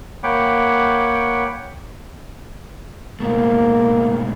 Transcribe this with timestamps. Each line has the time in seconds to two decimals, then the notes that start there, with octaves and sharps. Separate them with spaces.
0.23 A#3 C#5 F#5 G5 B5 D6
3.20 G#2 B2 A3 A#3